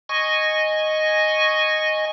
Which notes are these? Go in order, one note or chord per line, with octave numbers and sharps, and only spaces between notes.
D#5 G#5 C#6